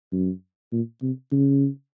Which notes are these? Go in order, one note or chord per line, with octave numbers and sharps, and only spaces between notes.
F#2
A#2
C3
C#3